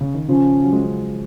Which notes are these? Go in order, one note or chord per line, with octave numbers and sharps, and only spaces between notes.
C#3
D#3
C#3 F3 C#4
F#3
F3 G#3